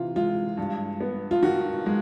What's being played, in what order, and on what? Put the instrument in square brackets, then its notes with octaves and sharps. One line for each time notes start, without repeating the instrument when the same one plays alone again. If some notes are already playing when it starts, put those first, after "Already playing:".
Already playing: [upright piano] C3 E3 F4
G#3 F4
G2
B3
F4
D#3 F#4
G#3